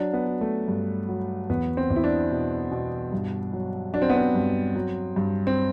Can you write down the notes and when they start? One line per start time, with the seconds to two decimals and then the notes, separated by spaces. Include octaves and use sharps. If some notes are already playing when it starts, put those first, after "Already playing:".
Already playing: F#3 D4
0.13 B3
0.27 F#3
0.41 A3
0.68 G2
1.09 F#3
1.50 E2 B3
1.77 C4
1.90 E2
1.96 E4
2.04 D4
2.31 B2
2.71 B2
3.12 G2
3.53 F#3
3.93 F#3 D4
4.02 C4
4.10 B3
4.18 C4
4.35 G2
4.76 F#3
5.16 G2
5.47 C4